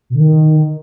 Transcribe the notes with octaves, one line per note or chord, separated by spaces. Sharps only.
B2
D3
D#3